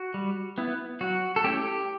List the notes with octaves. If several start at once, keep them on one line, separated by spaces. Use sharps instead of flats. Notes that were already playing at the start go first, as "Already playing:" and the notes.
Already playing: F#4
G3
B3 E4
F#3 F#4
A4
A3 C#4 E4 G4